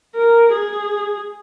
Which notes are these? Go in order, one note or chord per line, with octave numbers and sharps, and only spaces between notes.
A#4
G#4